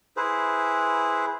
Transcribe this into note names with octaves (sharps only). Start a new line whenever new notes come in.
E4 G#4 B4 C5